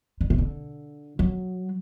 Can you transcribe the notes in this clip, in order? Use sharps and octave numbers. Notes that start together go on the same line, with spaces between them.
D3
C3
D3
F#3